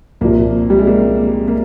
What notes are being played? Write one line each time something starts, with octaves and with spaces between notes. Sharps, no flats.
C2 A#2 F3 A#3
G3
G#3
A#3
A#3